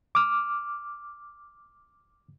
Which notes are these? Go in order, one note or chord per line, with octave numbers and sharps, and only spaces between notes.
D6 F6